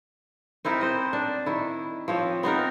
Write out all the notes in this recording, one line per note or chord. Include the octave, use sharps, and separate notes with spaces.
C4 D#4 E4 A#4
C5 D#5
D4
D#3 E4
F3 C4 C#5
B3 C4 D#4 A#4